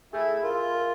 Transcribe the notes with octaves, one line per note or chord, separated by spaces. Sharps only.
A3 E4 G#4
F4 A#4
A#4